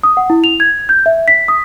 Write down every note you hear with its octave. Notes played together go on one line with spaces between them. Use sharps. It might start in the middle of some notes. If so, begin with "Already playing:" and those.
D#6
F#5
E4
F7
G#6
G6
E5
B6
D#6